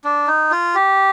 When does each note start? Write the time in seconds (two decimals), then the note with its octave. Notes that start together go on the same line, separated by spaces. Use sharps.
0.04 D4
0.27 D#4
0.51 F4
0.75 G4